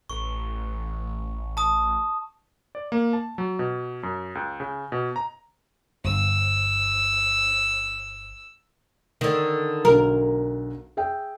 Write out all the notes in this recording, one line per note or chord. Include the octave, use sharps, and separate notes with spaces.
A1 C#6
A5 D#6
D5
A#3
A5
F#3
B2
F#2
C#2
C#3
B2
A#5
G1 E6
D3 D#3
B1 D3 A#4
G#4 E5 G5